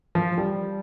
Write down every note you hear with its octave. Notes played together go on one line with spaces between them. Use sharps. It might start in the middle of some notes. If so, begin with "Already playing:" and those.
F3
G3